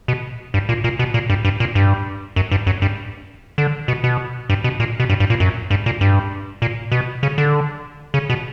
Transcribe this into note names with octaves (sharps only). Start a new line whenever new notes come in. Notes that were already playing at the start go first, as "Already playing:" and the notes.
B2
G2
A#2
A#2
B2
A#2
G2
G2
A#2
G2
F#2
G2
F#2
G2
D3
B2
B2
G2
B2
A#2
B2
G2
G2
A#2
F#2
G2
A#2
G2
A#2
B2
C#3
D3
C#3
B2